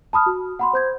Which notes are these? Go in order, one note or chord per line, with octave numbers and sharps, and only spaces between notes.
A5 B5 D#6 F6
F#4
F#5 B5 C6
C5 G6 G#6